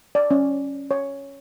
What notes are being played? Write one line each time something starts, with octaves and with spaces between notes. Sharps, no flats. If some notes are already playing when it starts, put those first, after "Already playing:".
D5
C#4
C#5